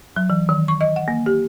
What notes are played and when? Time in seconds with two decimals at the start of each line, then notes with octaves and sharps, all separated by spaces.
0.16 F#3
0.30 E3
0.49 D#3
0.68 C#6
0.81 D#5
0.96 F#5
1.08 A#3
1.26 G4